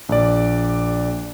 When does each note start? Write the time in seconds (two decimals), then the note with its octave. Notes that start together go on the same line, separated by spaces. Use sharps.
0.09 A#1 D5